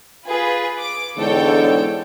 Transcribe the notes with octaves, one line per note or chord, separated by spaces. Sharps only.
F4 G#4 B4
D6
E2 G#2 D3 A4 C#5 G5